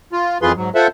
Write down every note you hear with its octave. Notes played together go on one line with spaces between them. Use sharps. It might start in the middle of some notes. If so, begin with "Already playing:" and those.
F4
F2 E3 F4 G#4 B4 C6
G#2 F#3
F4 A4 C5 E5 F#5